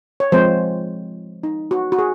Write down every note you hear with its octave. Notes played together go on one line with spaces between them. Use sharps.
C#5
F3 G#3 C4 C5
D#4
F#4
F#4
G#4